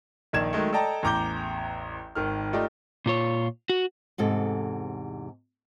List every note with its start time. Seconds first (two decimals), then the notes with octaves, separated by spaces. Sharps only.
0.33 A#1 D#3 D#4 D5 G#6 E7
0.53 D#3 F#3 G#3 A3
0.73 A4 D5 D#5 G5 A5 A#5
1.03 A1 E2 A#5 D6 G6 G7
2.15 G#1 D#3 F6
2.53 A3 D#4 F4 G4 D5
3.06 A#2 F4 C#5
3.70 F#4
4.18 E2 G#2 C3 A4